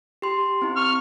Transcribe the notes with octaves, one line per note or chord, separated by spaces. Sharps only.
G4 C6
C4 E4
C#6 F6